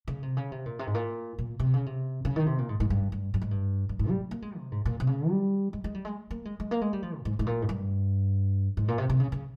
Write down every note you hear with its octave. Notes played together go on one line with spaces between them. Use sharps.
C#3
C3
C#3
C3
A#2
C3
G#2
A#2
A#2
C3
C#3
C3
C#3
D#3
C3
A#2
G#2
G#2
G2
G2
G2
G#2
G2
G2
G#2
G3
A#3
G#3
C3
G#2
A#2
C3
C#3
G3
G#3
G#3
G3
G#3
A#3
G#3
G#3
A#3
G#3
G3
F3
A#2
G#2
G#2
A#2
G#2
G2
G#2
A#2
C3
C3
C#3
C#3